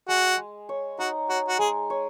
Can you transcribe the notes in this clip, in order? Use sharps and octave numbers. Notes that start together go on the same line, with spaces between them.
G#3 F#4
G#3
C#5
D#4 F#4
F#4 C#5
F#4
G#3 G#4
C#5